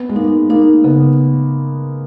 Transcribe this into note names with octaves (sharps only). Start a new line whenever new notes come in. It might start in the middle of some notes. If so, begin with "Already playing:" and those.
Already playing: B3
G#3
A#3 D#4
A#3 D#4
C#3 B3